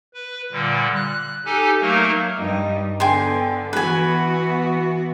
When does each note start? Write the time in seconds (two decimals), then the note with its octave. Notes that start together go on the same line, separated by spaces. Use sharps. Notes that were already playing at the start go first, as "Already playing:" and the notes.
0.14 B4
0.52 A#2 D3 G3
0.95 F#6
1.46 D#4 G4 A4 G#5
1.81 F#3 A3 A#3 D#4 A#4
2.36 G2 G3 D#4
3.00 D3 B3 G5 G#5 C6
3.73 E3 B3 F#4 B4 G#5